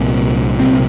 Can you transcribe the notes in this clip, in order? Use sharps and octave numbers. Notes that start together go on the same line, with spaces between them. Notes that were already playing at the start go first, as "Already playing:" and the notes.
Already playing: C2 A#2 C4
C2 A#2 C4